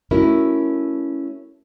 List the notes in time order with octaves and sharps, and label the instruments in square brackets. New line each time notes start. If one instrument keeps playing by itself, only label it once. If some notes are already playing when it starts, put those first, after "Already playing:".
[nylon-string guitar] A3 C#4 E4 F#4 A#4